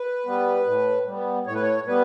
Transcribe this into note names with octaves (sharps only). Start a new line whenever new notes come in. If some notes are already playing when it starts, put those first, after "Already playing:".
Already playing: B4
G3 B3
A2
G3 B3
A2 C#5
B4
C#5
G3 B3 B4